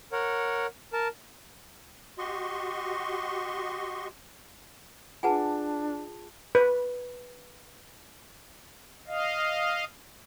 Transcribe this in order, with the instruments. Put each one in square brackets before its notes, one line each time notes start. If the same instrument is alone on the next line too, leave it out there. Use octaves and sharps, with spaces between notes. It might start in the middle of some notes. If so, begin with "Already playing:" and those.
[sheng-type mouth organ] A#4 C#5 F#5
A#4 A5
[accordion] F#4 G4 D#5 C6 C#6
[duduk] D4 [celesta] F4 G#4 A5 [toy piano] B4 F#5 G#5
[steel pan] B4
[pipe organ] D#5 F5